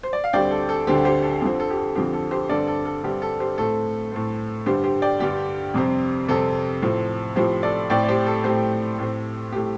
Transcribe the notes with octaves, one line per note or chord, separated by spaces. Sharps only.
C5
D5
F5
D2 D3 G3 C4 D5 G5
A4
A4
D2 D3 G3 C4 G4 C5
G4 C5
A4
F2 D3 F3 C4 A4
A4
G4
A4
F2 D3 F3 C4 G4
A4
G4 C5
G2 D3 G3 C4 A4 D5
A4
A4
G2 D3 G3 C4 G4
A4
G4 C5
A2 A3 C4 A4
A2 A3 C4
G2 D3 G3 G4 C5
G4 C5
D5 G5
G2 D3 G3 G4
F2 C3 G3 C4
F2 C3 G3 C4 A4
A2 F3 C4
A2 F3 C4 G4 C5
A4 D5
A2 A3 C4 D5 G5
D5
G4 C5
A4
A2 A3 C4 G4 C5
A2 A3 C4
A2 A3 C4 G4